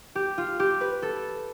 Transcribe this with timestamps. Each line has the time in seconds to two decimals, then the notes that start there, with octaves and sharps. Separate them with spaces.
0.15 G4
0.38 F4
0.60 G4
0.81 B4
1.02 A4